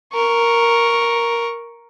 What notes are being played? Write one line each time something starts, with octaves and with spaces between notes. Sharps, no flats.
A#4 C#6